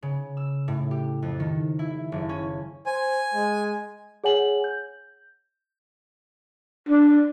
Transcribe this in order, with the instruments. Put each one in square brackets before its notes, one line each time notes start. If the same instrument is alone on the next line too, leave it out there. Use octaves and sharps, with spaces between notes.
[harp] C#3
E6
A2
G4
F2
D#3
E4
F#1
C#4
[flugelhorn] C5 [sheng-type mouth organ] G#5
[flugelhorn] G#3
[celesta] G#4 C#5 F#5 G#5 F#7
G6
[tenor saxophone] D4